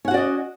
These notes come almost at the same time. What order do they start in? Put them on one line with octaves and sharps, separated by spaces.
C#4 F#5 F#4 D5 D#5